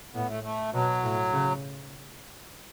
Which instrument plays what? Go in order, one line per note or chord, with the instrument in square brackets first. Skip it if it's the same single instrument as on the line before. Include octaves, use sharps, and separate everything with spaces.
[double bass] A2 [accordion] B3
[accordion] A3
A3
[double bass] B2 [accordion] F#3
[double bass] A2
C#3